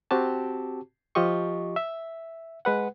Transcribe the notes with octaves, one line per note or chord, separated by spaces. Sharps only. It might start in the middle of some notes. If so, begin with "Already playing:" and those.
C4 F#4 G4 A5
F3 F4 G4 D#5 C#6
E5
G#3 B4 F#5